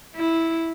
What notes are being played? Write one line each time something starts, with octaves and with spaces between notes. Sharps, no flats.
E4